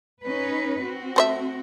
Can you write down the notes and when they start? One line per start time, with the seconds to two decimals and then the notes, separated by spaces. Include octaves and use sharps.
0.24 C#4 D#4 B4
0.80 C4 F#4
1.16 A3 C5 E5